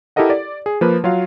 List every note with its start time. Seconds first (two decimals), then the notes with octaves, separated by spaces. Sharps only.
0.16 E4 G4 A4 A#4 D#5 F#5
0.30 D5
0.66 G#4
0.81 F3 A#3 B4
1.04 F#3 F4 F#4 F5